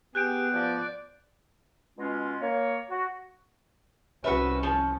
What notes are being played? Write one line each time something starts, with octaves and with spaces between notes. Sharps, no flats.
B3 G4 G#4 F#6 G6 D7
F3 D5
B2 G#3 C#4 F4
A#3 C#5
F#4
C2 C#4 F#4 B4 E5
F3